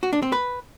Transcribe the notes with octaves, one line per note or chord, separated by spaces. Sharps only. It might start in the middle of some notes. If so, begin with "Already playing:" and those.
F#4
D4
C4
B4